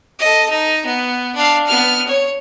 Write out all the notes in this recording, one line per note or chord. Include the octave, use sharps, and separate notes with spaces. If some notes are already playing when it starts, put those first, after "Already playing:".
A4 D#5
D#4
B3
D4 F5
B3 F6
C#5